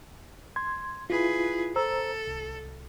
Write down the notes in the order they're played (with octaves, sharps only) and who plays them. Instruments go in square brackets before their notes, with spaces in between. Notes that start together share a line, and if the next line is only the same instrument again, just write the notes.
[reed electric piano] C6 G#6
[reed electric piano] E4 F4 [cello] G#4 B4
[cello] A4 [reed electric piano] C5 A#5 E6
[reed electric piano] C2